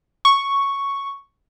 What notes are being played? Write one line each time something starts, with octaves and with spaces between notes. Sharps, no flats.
C#6